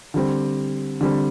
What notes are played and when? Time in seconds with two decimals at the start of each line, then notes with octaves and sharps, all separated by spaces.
0.14 D3 G3 C4
1.01 D3 G3 C4